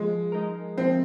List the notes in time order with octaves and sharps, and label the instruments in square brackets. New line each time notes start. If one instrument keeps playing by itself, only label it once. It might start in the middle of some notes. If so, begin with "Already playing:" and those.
Already playing: [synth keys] F3 [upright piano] G#3
[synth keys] G#3 D#4 A#4
[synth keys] F3 [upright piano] C4